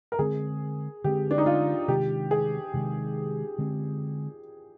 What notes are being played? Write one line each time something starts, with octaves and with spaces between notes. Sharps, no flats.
A#4
D3 G#3 C4 G#4
D3 G#3 C4 G4
D4
D#4
F4
C3 D#3 G#3 G4
G#4
C3 D#3 G#3
D3 G#3 C4